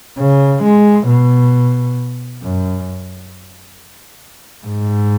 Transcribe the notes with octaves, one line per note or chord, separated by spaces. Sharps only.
C#3
G#3
B2
F#2
G#2